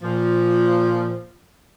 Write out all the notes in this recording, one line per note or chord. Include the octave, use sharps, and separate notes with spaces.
A#2 F3